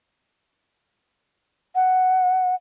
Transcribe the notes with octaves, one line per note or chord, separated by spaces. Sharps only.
F#5